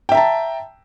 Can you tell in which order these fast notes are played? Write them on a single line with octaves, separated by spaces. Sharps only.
G5 E5 A#5 A5